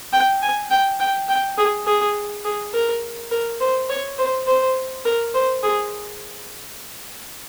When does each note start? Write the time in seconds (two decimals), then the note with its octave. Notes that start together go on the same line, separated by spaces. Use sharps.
0.13 G5
0.42 G#5
0.71 G5
1.00 G5
1.29 G5
1.58 G#4
1.87 G#4
2.45 G#4
2.73 A#4
3.31 A#4
3.60 C5
3.90 C#5
4.18 C5
4.47 C5
5.05 A#4
5.34 C5
5.63 G#4